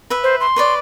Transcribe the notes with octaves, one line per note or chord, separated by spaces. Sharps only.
B4 E5
C5
C6
B4 C#5 D5